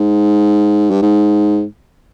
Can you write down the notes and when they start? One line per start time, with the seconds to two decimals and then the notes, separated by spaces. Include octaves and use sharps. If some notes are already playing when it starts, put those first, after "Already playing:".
Already playing: G#2
0.91 G2
1.02 G#2